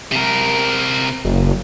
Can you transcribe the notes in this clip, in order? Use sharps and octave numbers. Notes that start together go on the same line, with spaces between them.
C3 A#4
F#1